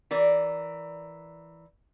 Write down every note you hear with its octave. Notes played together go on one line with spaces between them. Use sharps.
E3 A#4 D5